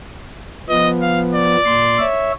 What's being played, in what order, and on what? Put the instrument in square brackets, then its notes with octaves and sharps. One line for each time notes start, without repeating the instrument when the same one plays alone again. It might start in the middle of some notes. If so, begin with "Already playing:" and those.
[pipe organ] F3 B3 [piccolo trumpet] D#5
[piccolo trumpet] F5
D5
[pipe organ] A#2 C6
C#5 E5